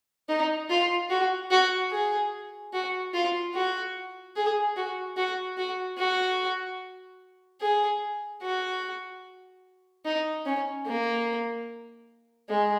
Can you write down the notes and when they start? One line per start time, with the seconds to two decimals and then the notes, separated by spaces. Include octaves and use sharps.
0.29 D#4
0.70 F4
1.10 F#4
1.51 F#4
1.92 G#4
2.73 F#4
3.14 F4
3.54 F#4
4.36 G#4
4.76 F#4
5.17 F#4
5.58 F#4
5.98 F#4
7.61 G#4
8.42 F#4
10.05 D#4
10.46 C#4
10.86 A#3
12.49 G#3